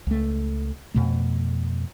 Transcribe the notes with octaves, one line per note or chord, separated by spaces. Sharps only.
C#2 A3
F2 B2 A3